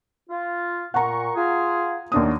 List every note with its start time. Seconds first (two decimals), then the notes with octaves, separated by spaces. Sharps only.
0.30 F4
0.94 A#2 F#5 A#5 C#6
1.36 F4 G#4
2.12 D#2 F#3 A3 A#3 D4 D#6